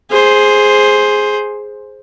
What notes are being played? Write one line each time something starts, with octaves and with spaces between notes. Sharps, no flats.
G#4 C5